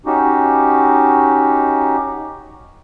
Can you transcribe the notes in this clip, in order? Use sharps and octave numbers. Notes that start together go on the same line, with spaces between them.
C#4 D#4 F#4 G4